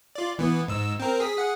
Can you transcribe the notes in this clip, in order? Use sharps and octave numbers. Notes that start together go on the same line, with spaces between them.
F4 D5
E3 B3
G#2 E6
C4 A#4
G#4 B6
G#4 F#5